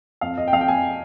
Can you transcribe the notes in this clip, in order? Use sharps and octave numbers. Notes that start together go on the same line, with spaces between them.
F2 F5
F2 D#5
G5
F2 F5
G5
F2 G#5